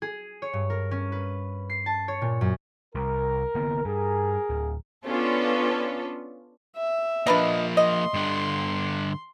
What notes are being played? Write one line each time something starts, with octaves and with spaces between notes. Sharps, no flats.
G#4
C#5
G2
A#4
C#4
B4
C7
A5
C#5
A#2
F#2
C2 A#4
D3 A#3 B3
G2 G#4 A#4
D1
B3 C#4 D4 F4 A4 B4
E5
F3 A#3 D4 B4 D#5
D#5 C6
G2 D3